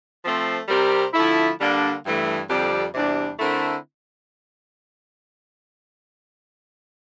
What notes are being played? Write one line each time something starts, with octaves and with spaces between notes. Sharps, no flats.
F3 A3 C4
C3 G3 C4 G4 A#4
D3 F3 A3 E4
D3 G3 A#3 D4
G2 E3 A3
F2 D3 G3 C4 G4
E2 C3 G3 D4
D3 A3 C4 E4 A#4